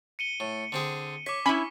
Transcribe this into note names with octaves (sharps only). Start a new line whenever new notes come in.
C#7 D#7 G7
A2
D3 C4 G#4
C#5 C#6 D6 B6
C#4 E4 G#5 B5